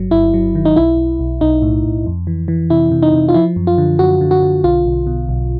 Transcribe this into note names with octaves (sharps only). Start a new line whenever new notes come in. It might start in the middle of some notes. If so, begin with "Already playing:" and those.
Already playing: G1 G2 F#3
G1 E4
F#3
D#3
D#4
B1 E4
B1
B1
B1 D#4
A2
B1
F2
E3
E3
C3 E4
C3
D#4
C3
F4
F3 E4
F#2
F4
D3
F#2 F#4
D3
F#4
D3
B1 F4
B1
B2
B1